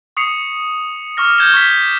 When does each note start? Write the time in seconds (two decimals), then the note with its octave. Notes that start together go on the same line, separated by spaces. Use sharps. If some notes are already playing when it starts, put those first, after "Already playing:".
0.17 C#6 D#6 C7 C#7 F7
1.17 C#6 D6 F6 A#6
1.38 G6 G#6 E7 G7
1.54 C#6 B6